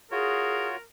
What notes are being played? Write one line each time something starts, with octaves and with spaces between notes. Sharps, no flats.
F4 F#4 G#4 A#4 C#5